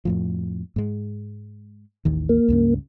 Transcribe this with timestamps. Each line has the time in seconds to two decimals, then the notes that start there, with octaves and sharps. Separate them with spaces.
0.05 F2 A2 F3
0.76 G#2 G#3
2.05 A1 D#2 D#3
2.29 A#3
2.49 C#2 G2 C#3